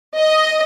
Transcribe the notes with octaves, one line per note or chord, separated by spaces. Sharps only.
D#5